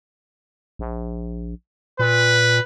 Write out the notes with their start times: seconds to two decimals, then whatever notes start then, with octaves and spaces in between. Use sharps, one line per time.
0.79 A#1
1.99 A#2 B4